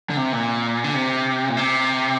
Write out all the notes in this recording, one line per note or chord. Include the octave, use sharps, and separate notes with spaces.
D3
C3
A#2
D3
C3
A#2
C3